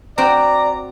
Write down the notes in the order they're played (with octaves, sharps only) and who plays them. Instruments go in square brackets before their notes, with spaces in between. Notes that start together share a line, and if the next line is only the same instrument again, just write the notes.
[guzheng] C4 F#4 G5 [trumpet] D5 [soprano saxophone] A#5